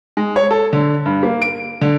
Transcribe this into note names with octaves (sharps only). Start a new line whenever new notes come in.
G#3
C#5
A4
D3
G2
A#3
D7
D3